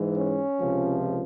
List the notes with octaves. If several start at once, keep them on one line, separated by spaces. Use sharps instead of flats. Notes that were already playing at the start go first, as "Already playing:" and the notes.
Already playing: G#2 E3 G#3
C#4
C#2 C3 F3